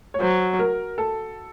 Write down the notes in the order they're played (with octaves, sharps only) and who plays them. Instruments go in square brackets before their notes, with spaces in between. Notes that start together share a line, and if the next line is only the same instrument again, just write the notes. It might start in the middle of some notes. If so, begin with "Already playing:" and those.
[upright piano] C#5
[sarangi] F#3 [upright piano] C5
[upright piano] A#4
A4